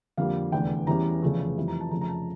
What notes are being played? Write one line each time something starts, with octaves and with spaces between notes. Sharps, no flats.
F2 D3 G3 A#3 F5
F1 E2 D3 G5
E2 E3 G3 C#4 A#5
F1 E2 C#3 F3 A3
F2 E3 G3
A#5
A5
F1 F2 C#3 A#5
A#5
A5